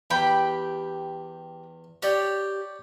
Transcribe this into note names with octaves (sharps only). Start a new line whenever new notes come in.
E2 G4 G5 B5
G4 C#5 D5